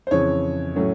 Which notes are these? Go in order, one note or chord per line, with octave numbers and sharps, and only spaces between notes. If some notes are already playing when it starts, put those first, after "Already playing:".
C5
F2 C#3 E3 C#5
A2 F#3 A3 C#4